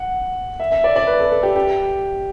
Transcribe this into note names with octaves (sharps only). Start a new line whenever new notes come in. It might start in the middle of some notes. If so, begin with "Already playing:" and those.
Already playing: F#5
E5
E5
D5
D5
B4
A4
A4
G4
G4